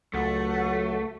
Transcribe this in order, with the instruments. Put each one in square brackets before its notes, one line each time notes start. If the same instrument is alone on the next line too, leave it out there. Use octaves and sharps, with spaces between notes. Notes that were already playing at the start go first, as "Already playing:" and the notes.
[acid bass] C#2 [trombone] F#3 [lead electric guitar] A3 [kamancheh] F#5